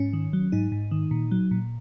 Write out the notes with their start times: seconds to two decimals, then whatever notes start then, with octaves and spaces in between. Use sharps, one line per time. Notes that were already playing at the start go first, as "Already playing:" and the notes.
Already playing: G#2 C#4
0.13 D#3
0.33 F#3
0.52 G#2 D#4
0.72 G#2
0.91 D#3
1.11 A#2
1.31 F#3
1.51 A#2